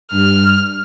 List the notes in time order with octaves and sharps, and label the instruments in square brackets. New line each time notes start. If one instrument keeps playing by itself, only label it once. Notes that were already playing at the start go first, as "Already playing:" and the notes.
[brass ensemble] G2 [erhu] F6